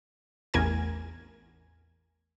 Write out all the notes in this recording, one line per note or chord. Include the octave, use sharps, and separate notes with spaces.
A1 E2 A#4 G#5 G#6